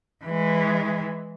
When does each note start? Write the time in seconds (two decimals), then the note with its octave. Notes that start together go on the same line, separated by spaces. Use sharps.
0.24 E3 G#3